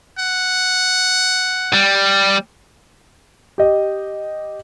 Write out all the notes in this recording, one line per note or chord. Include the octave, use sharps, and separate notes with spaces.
F#5
G3
G4 D#5